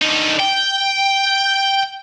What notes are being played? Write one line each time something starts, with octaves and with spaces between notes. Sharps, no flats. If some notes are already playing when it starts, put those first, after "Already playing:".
D3 D#4
G5